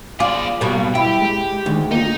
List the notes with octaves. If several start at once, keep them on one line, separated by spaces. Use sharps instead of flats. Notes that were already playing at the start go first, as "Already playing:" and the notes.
F4 G#4 D5 D6
B1 B2 G3 A#3
E4 G4
G#3
D2 D#3 G#3
A#3 D#4 F4